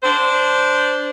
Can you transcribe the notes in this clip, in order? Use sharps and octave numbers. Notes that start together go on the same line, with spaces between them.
D4 C5